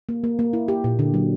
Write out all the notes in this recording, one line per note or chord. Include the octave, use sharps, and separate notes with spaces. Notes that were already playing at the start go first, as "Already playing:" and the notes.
A#3
A#3
A#3
E4
G4
A#2
D3
F#3